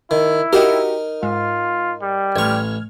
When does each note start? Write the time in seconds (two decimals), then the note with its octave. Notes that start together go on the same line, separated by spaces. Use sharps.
0.11 D#3 E4
0.53 D#4 F#4 G4 A#4
1.23 G#2 F4
2.02 G3
2.36 A1 C#6 F6 G#6